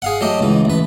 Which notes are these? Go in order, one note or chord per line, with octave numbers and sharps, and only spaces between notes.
G#4 F5 F#5
F#3 A3 G4 D#5
C#2 E3
A1 B4